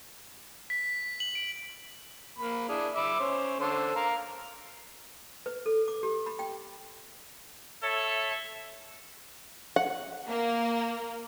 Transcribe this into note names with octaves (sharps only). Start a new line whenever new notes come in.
B6
F#7
D7
A#3 B5
D4 E4 G#4
E5 B5 D6
C#4 C5
D3 A4 C5
A#4 F5 A#5
B4
A4
D6
G4
B5
G5
A4 C#5 E5
F#5
A#3